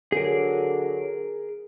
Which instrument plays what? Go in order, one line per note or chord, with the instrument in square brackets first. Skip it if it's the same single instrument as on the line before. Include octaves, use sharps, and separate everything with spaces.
[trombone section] D3 F#3 [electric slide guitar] G#4 A#4